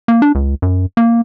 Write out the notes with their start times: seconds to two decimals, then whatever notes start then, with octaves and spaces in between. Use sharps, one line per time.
0.08 A#3
0.22 D4
0.35 C#2
0.62 F#2
0.97 A#3